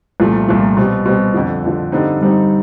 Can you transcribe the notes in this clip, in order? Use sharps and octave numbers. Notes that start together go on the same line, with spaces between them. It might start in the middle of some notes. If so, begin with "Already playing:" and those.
C2 A#2 F3 A3
C2 A#2 F3 A3
B2 G3 C4
B2 G3 C4
F2 D3 F3
F2 D3 F3
G2 D3 G3 C4 D#4
G2 D3 G3 C4 D#4